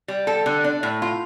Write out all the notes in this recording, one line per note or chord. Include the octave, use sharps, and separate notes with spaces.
G3
A4
D3
D4
A2
F4